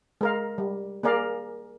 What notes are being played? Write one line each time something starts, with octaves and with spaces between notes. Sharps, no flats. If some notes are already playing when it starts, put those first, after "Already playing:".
G#3 A#4 F5
G3
A#3 G#4 A#4 D5 F5